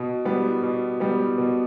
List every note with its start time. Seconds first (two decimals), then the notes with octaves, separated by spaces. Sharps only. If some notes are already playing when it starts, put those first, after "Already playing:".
Already playing: B2
0.25 G3 B3
0.63 B2
1.00 G3 B3
1.38 B2